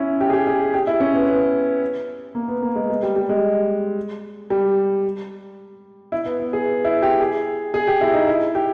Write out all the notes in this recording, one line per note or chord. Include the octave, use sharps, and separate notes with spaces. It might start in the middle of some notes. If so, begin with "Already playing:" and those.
Already playing: C#4 E4
G4
G#4
G4
G#4
G4
E4
C#4
B3
B3
A#3
B3
A#3
G#3
G#3
G3
G3
G#3
G3
E4
B3
B3
G#4
E4
G4
G#4
G#4
G4
E4
D#4
E4
G4